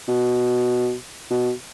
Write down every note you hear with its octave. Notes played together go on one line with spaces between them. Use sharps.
B2
B2